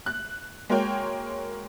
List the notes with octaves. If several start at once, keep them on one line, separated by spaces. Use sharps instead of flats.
F#6
G#3 A#3 F#4 A#4 C#5 G5